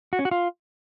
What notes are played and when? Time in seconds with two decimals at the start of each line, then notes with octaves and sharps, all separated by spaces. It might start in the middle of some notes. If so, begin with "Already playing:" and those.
0.13 F#4
0.19 C#4
0.25 F#4
0.31 F4